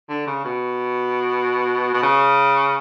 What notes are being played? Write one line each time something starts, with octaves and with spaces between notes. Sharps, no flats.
D3
C#3
B2
B2
C#3